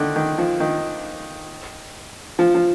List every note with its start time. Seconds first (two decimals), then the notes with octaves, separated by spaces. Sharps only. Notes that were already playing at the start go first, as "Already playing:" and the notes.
Already playing: D3 D#3
0.16 D#3
0.38 F3
0.60 D#3
2.39 F3
2.55 F3